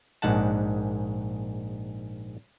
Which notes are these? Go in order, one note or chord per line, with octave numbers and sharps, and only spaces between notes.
A#1 G#2 G#3 F#5 A5